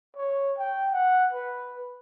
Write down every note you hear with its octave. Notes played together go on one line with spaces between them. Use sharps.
C#5
G5
F#5
B4